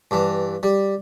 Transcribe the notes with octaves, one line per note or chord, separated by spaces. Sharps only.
G2 E3
G3